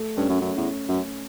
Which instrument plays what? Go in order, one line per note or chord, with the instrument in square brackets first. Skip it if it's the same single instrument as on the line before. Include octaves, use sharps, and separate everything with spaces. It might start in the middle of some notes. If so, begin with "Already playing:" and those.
Already playing: [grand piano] A3
[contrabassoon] G2 [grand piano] C#4
[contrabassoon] F#2
F#2
E2
F#2